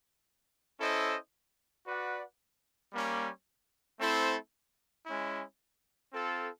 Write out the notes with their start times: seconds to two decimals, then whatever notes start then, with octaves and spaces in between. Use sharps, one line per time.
0.80 C#4 E4 A4 C5 D#5
1.86 F#4 B4 D5 F#5
2.93 G3 A#3 C#4
4.00 A3 C4 E4 A4 C5
5.06 G#3 C#4 E4
6.13 C4 F4 A4